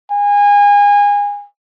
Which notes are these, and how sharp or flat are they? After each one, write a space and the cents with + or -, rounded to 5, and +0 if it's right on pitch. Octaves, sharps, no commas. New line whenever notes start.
G#5 -25